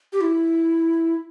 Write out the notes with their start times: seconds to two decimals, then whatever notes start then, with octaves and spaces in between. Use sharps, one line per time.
0.13 G4
0.21 E4